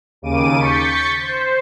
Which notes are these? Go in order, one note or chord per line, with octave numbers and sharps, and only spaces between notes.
D#2 C#3 D6 D#7
C#6 G6 A6 B6 C#7
C5